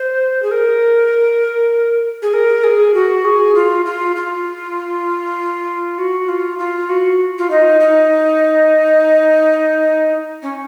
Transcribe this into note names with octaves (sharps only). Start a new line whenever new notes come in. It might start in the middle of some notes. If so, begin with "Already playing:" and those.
Already playing: C5
G#4
A#4
G#4
A#4
G#4
F#4
G#4
F4
F4
F4
F#4
F4
F4
F#4
F4
D#4
D#4
C#4